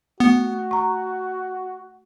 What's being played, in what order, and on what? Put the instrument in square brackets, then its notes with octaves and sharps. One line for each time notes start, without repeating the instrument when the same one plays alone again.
[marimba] A3 [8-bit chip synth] B3 [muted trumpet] F#4
[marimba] A#5 C#6